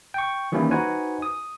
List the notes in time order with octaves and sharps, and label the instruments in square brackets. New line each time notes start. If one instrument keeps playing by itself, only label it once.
[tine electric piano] G5 C#6
D#3 E3 G3 A#3 C#4 E4
D#4 F#4 B4 C5 F#5 G#5
D#6